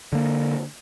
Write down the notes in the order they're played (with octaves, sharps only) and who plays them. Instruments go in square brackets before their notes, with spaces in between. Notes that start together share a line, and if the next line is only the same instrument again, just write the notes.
[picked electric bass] D3 A#3